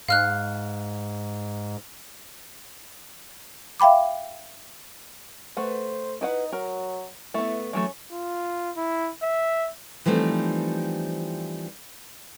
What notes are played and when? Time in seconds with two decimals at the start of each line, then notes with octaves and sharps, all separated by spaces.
0.08 G#2 F5 F6 F#6
3.80 E5 F5 G5 B5 D6
5.57 A3 B4 C5 F#5
6.21 D#4 E4 B4 F#5
6.52 F#3 A#4
7.34 A3 B3 E4
7.73 E3 F#3 A3 C#4
8.12 F4
8.77 E4
9.23 E5
10.06 E3 F3 G3 A3 C4 D#4